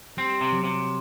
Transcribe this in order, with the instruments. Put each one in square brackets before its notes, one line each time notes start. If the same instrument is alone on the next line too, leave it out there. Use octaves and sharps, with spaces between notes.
[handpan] G3 [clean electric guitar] C4
[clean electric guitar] C3
[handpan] F#3
[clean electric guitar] C3